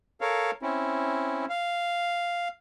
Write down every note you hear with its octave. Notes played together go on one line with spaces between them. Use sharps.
A4 A#4 C#5 F5
C4 C#4 E4
F5